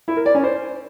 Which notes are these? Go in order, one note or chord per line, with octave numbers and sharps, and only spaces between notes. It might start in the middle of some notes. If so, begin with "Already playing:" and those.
E4
A#4
D5
C#4
C5